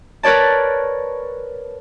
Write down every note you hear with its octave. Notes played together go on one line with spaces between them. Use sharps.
A#4 B4 C#5 D5 A5